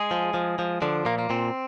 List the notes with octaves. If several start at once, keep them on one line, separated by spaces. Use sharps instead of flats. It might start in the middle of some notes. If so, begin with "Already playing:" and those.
Already playing: G#3 G#4
F3
F3
F3
D3 F3 D4
A#2 A#3
A#3
A#2 C4